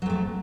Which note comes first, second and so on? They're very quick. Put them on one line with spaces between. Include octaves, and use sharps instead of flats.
F#3 F2 A3